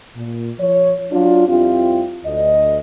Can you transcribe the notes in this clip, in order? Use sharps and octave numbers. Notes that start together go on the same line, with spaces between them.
A#2
F3 C#5
F#3 D4 F4
F2 G3 C4 E4 F4 G4
D2 D#5